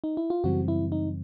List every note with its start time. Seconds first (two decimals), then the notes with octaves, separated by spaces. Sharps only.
0.04 D#4
0.17 E4
0.30 F4
0.44 F#2 C#3 E3 G3 C4 F#4
0.68 E4
0.92 D#4